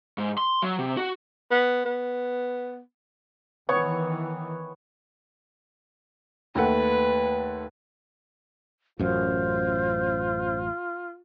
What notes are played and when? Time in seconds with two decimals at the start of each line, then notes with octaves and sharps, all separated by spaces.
0.18 G#2
0.38 C6
0.62 F#3
0.79 C3
0.97 F#4
1.51 B3
1.85 B3
3.69 D#3 E3 B3 C#5 C#6
6.55 D#2 A3 B4 F#5
8.99 A1 F#2 F4 C5